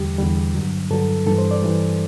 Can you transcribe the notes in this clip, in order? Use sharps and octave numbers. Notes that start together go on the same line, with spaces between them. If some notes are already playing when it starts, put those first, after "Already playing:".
Already playing: E2 D3 G3 G4
E2 D3 G3
G2 D3 F#3
G2 D3 F#3 A4
G2 E3 G3 A4
C5
D5
G2 E3 G3